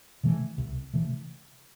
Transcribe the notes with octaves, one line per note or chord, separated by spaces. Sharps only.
C3 E3 A3
C2
C3 E3 A3